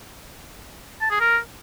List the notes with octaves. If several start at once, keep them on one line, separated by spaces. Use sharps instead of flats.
A5
G#4
A#4